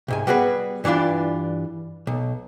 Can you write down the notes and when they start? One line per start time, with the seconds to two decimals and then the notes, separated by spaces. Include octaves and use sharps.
0.08 C2 G#2 G#5
0.27 G3 B3 F#4 G#4 B4
0.84 G2 E3 G3 D4 F4
2.07 B1